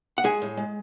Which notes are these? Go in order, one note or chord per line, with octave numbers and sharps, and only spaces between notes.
F#5
G#3 G#4 G#5
A2
G#3